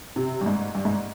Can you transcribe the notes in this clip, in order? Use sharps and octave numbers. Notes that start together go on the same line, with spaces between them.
C3
G2
G#2
G2
G#2